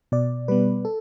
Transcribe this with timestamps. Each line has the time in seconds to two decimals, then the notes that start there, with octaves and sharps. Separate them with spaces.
0.12 B2 D5
0.48 G3 B3 B4
0.85 A4